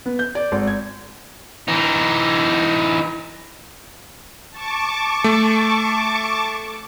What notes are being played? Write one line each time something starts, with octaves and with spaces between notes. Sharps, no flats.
B3
G6
D5
G#1
G#6
E3 D#4
A5 C#6 D6
A3